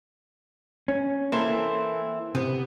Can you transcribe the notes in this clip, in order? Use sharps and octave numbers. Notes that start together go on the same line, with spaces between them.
C#4
E3 A#3 C4 E4 A4
C3 B3